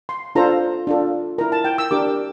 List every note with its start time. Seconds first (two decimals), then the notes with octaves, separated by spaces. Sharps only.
0.09 C6
0.35 D4 F4 A4 C5 A#5
0.87 D4 F4 A4
1.38 E4 A#4 A#5
1.52 A5
1.65 G5
1.78 E6
1.91 D4 G4 A#4 D6